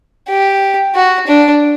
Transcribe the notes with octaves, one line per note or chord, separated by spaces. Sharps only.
G4
F#4
D4